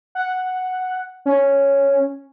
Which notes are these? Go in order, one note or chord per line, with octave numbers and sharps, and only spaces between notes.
F#5
C#4